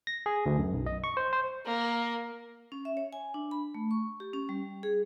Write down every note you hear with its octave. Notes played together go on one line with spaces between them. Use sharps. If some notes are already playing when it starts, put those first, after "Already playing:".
A#6
G#4
D2
F#2
B1
D#5
C#6
C5
C5
A#3
C#4
E5
C#5
G#5
D4
B5
A3
C#6
G4
C#4
G3
G#4